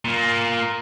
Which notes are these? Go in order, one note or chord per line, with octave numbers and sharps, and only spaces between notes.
A#2 A#3